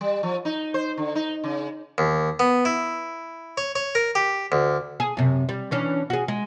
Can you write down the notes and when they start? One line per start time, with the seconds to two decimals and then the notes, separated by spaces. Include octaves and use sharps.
0.01 G3
0.23 F3
0.45 D#4
0.74 C5
0.97 D3
1.15 D#4
1.44 C#3
1.98 D#2
2.40 B3
2.65 E4
3.57 C#5
3.75 C#5
3.95 A#4
4.15 G4
4.52 D2
5.00 G#4
5.17 F#2 C3
5.49 G3
5.71 E3 C#4 D4
6.10 F#4 G#4
6.28 G#3